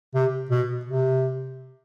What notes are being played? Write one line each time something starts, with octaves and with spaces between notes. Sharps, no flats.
C3
B2
C3